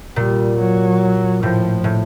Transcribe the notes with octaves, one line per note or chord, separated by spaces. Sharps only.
A#2 G3
F#3
A2 F3
A2